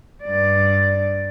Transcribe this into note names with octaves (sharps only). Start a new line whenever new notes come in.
G2 D5